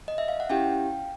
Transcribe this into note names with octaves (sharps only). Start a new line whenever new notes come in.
D#5
E5
F5
F#5
C#4 E4 G4 F5 G5